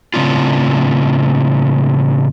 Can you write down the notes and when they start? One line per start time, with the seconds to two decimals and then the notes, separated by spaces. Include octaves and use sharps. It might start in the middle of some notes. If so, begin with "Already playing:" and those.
0.14 A2 C#3 G#3 C4 D4 F4